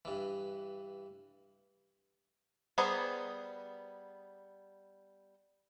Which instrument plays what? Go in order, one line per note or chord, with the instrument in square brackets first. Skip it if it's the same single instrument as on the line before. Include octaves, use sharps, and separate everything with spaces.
[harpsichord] G2 E3
[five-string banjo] G3 B3 G#4 C5 A#5